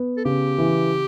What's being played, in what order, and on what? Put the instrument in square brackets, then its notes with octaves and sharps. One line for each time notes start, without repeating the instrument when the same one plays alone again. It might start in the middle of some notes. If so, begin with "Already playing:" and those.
Already playing: [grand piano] B3
[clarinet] A4
[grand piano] C#3 [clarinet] G4
[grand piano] E3